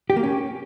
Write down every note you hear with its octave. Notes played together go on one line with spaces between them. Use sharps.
G4
A#3
C#4